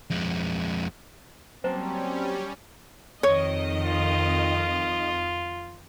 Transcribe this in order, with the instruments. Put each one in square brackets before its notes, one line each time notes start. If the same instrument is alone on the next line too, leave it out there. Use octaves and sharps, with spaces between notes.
[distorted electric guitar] F2 G#3
[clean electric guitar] F#3 A#3 A5 [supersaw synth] G3 C#4 [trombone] C4 [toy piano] C5
[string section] F2 D#3 D#5 [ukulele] C#5
[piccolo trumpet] F4